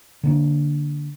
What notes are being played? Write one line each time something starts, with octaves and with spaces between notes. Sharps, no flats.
D3 A#3 D4